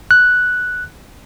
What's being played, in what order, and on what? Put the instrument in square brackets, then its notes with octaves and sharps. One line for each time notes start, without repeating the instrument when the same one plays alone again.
[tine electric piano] F#6